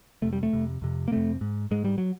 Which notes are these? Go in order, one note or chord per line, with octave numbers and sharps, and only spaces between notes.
F2 C3 A3
G3
A3
F2 C3
F2 C3
A#3
F2 C3 A3
G#2
G#2 G#3
G3
F#3